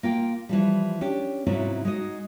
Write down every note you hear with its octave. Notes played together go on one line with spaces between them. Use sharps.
A#3 F4 G5
E3 F3 G3
C#4 D4 G4
G#2 C3 F#3 C#4 E4 F4
G#3 D#4 F#4 D#5